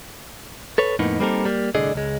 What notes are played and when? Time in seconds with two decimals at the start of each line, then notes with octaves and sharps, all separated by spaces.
0.78 A4 B4 C#5
0.99 F2 A2 A#3 B3 D#4
1.20 G3 A#3 C4 D#4 A4 A#4
1.45 G3 A#3
1.75 C2 A2 D3 G#4 D5 D#5
1.94 C#2 G#3